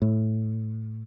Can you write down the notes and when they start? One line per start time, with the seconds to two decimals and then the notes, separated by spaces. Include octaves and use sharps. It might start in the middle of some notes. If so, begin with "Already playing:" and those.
0.02 A2